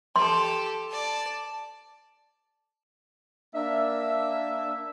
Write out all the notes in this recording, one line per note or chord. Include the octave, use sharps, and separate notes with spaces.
G4 A4 C6
D5 A5
A#3 D4 E5